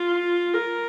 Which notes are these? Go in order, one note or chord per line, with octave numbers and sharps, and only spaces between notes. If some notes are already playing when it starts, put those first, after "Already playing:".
Already playing: F4
A#4